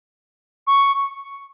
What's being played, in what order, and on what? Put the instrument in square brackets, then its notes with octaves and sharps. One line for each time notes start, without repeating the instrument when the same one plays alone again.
[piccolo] C#6